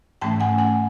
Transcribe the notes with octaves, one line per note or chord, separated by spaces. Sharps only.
G#2 E3 A3 C#4 G5 A5
F#5 G#5
F#5 G#5